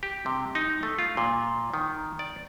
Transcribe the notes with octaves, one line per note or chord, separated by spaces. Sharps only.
G4
C3
D#4
A3
F4
A#2
D#3
D5